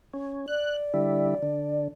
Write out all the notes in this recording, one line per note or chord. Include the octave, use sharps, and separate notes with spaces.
C#4
D5 F#6
D3 G3 E4
D3